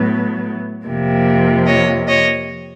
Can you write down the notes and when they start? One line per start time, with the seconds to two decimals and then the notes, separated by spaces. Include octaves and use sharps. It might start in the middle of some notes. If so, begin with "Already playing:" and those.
Already playing: A2 F#3 B3
0.85 F2 C3 F3 A#3
1.67 C#5 D#5
2.08 C#5 D#5